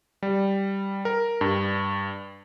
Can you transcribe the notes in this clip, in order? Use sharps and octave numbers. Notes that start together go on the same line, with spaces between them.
G3
A#4
G2